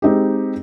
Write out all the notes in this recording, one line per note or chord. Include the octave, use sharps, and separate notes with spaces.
G#3 C4 D#4 G4